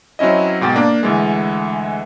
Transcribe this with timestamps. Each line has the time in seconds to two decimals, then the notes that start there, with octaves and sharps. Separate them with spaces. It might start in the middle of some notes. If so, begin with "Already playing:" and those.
0.19 F#3 C4 C#4 E4 D#5
0.61 G#2 B2 G5 A6
0.76 A#3 D4
1.03 D2 E3 G#3